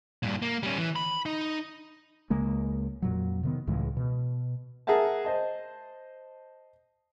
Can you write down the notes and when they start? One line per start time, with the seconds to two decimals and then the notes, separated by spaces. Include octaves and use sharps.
0.23 G2 A#2
0.42 A#3
0.63 G3 C#4
0.78 E3
0.96 B5
1.26 D#4
2.30 C#2 C#3 G#3 A#3
3.02 F2 A#2 F#3
3.43 C3 D#3 B3
3.67 C#2 A2 E3 G#3
3.97 B2
4.87 G#4 A#4 E5 F#5 A5
5.25 C5 D#5 A5